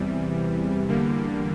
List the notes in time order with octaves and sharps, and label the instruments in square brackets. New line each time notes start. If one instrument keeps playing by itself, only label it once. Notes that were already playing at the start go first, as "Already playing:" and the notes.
Already playing: [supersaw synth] E2 C3 E3 G3
E2 D3 G3 A#3